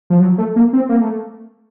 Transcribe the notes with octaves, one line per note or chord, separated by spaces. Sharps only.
F3
F#3
A3
A#3
C4
A#3
A3